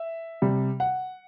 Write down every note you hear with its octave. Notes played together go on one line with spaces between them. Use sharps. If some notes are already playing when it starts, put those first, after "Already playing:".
Already playing: E5
C3 G3
F#5